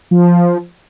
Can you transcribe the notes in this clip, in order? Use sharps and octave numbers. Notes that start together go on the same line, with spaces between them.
F3